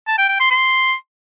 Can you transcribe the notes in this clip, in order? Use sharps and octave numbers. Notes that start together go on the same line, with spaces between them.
A5
G5
G5
C6
C6